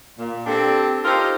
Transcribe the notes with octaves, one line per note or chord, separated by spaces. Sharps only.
A#2
C4 D4 G4 A4
D#4 F4 G4 A4 A#4 C5